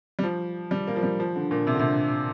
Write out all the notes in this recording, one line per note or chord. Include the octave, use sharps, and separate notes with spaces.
G3
F3
G3
A#3
F3
G3
F3
D3
A#2
C3
D3
C3